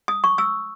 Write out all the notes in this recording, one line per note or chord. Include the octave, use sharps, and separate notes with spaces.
D#6
C#6
E6